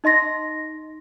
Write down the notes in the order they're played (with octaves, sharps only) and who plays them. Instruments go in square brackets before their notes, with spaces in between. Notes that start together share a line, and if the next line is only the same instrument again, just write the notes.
[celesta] D#4 D#5 C6 A#6